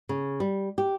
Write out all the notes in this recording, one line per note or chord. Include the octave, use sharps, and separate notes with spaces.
C#3
G3
G4